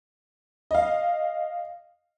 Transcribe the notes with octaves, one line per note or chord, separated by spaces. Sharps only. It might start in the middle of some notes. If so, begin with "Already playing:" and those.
D#5 F5